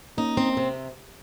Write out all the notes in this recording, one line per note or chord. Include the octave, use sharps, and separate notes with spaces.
A#3 C#4 D#4
C4
C3